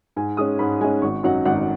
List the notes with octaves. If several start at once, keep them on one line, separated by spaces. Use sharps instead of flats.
G#2 G#5
G#3 C#4 D#6
G#2 B5
G#3 C#4 G#5
G#1 C#6
F#2 F#3 D#4 F#5
G#1 F#5